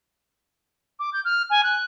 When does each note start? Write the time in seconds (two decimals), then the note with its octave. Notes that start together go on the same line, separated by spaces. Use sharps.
0.99 D6
1.13 G6
1.24 F6
1.50 G#5
1.63 F#6